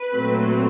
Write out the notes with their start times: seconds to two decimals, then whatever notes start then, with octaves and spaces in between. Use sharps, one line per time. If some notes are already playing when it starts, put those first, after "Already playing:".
Already playing: B4
0.12 A#2 F#3 A3 C4